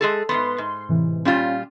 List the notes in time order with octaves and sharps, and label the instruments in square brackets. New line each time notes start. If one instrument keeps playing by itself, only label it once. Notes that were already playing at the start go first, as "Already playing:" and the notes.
[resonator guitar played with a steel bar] G#3 G#4 A4
[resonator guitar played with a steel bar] G#2 C3 B3 [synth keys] C6
[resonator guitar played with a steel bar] G#2
[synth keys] A2 C3 E3
[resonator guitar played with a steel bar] A#2 G3 F4 [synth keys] C#4